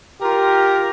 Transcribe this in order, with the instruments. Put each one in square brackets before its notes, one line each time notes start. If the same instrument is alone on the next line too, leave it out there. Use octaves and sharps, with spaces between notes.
[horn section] F4 G4 A#4